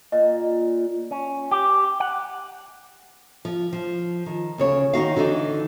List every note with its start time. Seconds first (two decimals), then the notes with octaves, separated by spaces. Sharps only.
0.12 A#2 D#5
1.11 C#4
1.51 G4
2.00 F#5
3.45 F3
3.73 F3
4.26 D#3
4.58 D2 C#3 C#5
4.93 D#3 D#4 F#4 F5
5.16 D3 E3 D4 D#4